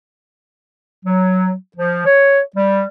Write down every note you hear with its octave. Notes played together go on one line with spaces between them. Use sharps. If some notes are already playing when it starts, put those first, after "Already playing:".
F#3
F3
C#5
G3